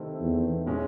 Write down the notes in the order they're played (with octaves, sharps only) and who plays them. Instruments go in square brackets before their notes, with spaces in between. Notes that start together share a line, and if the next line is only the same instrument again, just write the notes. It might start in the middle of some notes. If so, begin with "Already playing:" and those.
Already playing: [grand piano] C3 D#3 A3 C4 E4
[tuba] E2
[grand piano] A2 G#3 C#4